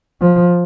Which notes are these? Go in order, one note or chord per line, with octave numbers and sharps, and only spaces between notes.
F3